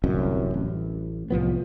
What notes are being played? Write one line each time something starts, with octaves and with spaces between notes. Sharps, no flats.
D1 C2 F#2
A1
C2 A2 F3 B3